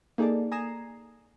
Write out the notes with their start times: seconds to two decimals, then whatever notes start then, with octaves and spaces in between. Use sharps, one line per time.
0.18 A#3 D#4 G#4 A4 D5 A5
0.52 G#5 A#5 D#6 G#6 C7 E7